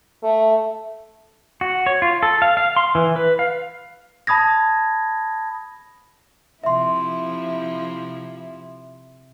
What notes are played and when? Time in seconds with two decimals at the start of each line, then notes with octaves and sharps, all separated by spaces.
0.23 A3
1.61 F#4
1.86 C#5
2.02 F4
2.23 A4
2.42 F5
2.57 F5
2.77 C6
2.95 E3
3.16 B4
3.39 F5
4.27 A5 B5 D#6 G#6 A#6
6.64 C3 F3 E4 E5 C6